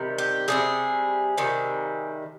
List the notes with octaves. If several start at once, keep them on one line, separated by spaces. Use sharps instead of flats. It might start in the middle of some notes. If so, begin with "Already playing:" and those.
Already playing: C3 D#3 G3
G4
C3 D#3 G3 G#4
C3 D#3 G3